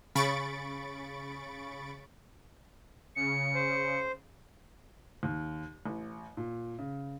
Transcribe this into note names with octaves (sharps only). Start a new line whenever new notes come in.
C#3 B5 C#6 A6 D7
C#3 C#7
C5
D#2
A1
A#2
C#3